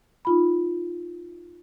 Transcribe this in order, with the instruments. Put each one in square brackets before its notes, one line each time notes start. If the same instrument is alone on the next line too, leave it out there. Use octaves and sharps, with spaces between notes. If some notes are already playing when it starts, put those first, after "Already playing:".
[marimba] D#4 F4 B5